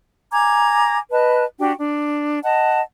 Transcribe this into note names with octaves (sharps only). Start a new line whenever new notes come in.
G#5 A#5 D6 G#6
B4 D#5 A5 F#6
D4 F#4 G4 G5
D4
D#5 F#5 A5